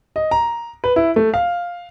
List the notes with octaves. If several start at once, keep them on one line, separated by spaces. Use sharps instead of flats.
D#5
A#5
B4
E4
A3
F5